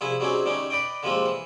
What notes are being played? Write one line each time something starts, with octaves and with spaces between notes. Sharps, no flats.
C2 F3 E4 G#4
F#3 G3 C4 C#4 D#4 G#4
D3 G3 A3 C#4 D#4
B4 D5 D#5 G5
D3 F3 G3 G#3 A#3 C4
E3